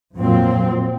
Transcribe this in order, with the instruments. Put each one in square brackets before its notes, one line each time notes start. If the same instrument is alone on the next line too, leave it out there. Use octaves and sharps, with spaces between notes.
[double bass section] F2 A#2 F#3 C4